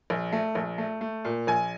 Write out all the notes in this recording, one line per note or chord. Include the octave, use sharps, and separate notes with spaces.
A#1
A3
A#1
A3
A3
A#2
A#1 G#5